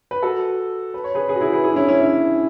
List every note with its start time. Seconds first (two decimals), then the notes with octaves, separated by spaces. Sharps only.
0.11 B4
0.23 F#4 A4
0.94 B4
1.04 C#5
1.15 G#4 B4
1.28 G#4 B4
1.35 F#4
1.41 E4 G#4
1.53 G#4 B4
1.64 E4 G#4
1.71 D4
1.76 C#4 E4
1.88 C#4 E4
2.00 C#4 E4